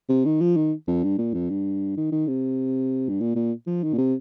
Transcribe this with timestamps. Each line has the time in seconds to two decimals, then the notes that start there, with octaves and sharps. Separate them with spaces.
0.09 C3
0.25 D#3
0.41 F3
0.56 D#3
0.87 F2
1.03 G2
1.18 A#2
1.34 F2
1.50 G2
1.97 D#3
2.12 D#3
2.27 C3
3.09 G2
3.20 A#2
3.36 A#2
3.67 F3
3.83 D#3
3.93 A#2
3.98 C3